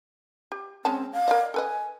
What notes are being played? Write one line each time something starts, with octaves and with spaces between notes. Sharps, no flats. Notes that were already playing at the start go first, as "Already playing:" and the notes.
G4
G#3 C4 C#4 A5
F5
A#4 D5 D#5
A4 B4 D#5 G#5